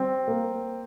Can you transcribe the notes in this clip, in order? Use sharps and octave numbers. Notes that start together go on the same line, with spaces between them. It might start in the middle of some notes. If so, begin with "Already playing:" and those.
Already playing: G3 C4
A#3